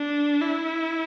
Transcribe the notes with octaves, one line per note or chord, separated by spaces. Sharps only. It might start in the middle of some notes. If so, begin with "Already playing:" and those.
Already playing: D4
E4